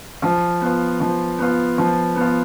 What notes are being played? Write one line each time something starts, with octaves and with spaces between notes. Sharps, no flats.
F3
B3 F4
F3
B3 F4
F3
B3 F4